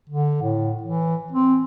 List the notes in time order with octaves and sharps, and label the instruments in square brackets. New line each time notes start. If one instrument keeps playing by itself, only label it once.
[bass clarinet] D3
A2
E3
C4